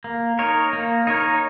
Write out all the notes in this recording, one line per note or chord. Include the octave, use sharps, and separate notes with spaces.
A#3
D#4 A#4 C#5
A#3
D#4 A#4 C#5